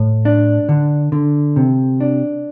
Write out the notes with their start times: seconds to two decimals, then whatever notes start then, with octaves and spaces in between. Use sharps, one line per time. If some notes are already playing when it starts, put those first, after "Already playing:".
Already playing: A2
0.25 D4
0.69 D3
1.12 D3
1.56 C3
2.00 D4